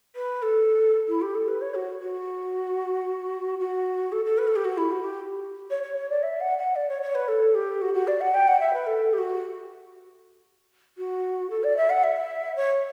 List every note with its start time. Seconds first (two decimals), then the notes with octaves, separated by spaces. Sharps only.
0.15 B4
0.42 A4
1.08 E4
1.21 G4
1.35 A4
1.48 B4
1.61 C#5
1.74 F#4
2.01 F#4
3.59 F#4
4.12 A4
4.25 A4
4.38 B4
4.47 A4
4.56 G4
4.64 F#4
4.77 E4
4.91 F#4
5.04 G4
5.70 C#5
5.83 C#5
5.96 C#5
6.09 D5
6.23 E5
6.40 F#5
6.58 F#5
6.75 D5
6.88 C#5
7.02 C#5
7.15 B4
7.28 A4
7.54 G4
7.81 F#4
7.94 F#4
8.07 D5
8.20 F#5
8.34 G5
8.47 F#5
8.60 E5
8.73 B4
8.86 A4
9.13 G4
9.18 F#4
10.98 F#4
11.50 A4
11.63 D5
11.77 E5
11.90 F#5
12.03 E5
12.56 C#5